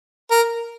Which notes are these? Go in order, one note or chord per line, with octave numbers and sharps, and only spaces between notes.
A#4